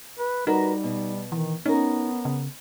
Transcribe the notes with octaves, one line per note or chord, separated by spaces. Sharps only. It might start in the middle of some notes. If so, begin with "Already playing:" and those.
B4
G3 D#4 F#4 A#4 B4
B2
D#3 E3
B3 C#4 D#4 A#4
C#3